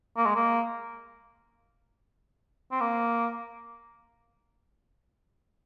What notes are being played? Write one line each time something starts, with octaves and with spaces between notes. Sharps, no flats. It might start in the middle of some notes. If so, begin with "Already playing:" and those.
A#3
G#3
A#3
C4
A#3